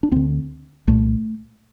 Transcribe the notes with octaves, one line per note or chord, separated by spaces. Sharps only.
D4
D2 D3 C4
C2 A#2 A3